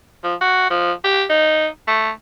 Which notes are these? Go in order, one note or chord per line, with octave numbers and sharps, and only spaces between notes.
F3
F#4
F3
G4
D#4
A3